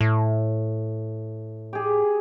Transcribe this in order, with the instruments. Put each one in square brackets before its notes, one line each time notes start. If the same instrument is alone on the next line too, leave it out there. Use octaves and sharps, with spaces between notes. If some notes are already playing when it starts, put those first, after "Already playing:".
[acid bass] A2
[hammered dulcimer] G4 G#4